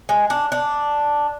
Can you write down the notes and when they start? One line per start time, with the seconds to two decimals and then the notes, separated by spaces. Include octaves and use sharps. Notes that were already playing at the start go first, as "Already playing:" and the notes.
0.09 G#3
0.30 D4
0.52 D4